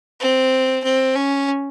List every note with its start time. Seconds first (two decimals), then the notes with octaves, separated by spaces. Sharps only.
0.20 C4
0.84 C4
1.16 C#4